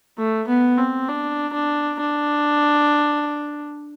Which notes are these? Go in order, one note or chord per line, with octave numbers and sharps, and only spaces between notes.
A3
B3
C4
D4
D4
D4